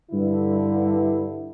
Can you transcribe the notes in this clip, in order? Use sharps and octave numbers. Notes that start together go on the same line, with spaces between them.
G2 D3 E4